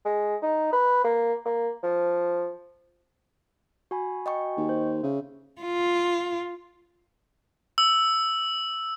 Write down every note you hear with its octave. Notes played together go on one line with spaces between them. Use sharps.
G#3
D#4
B4
A#3
A#3
F3
F#4 G#5 B5
D#5 G5 C#6
D#2
C5
C#3 E5
F4
E6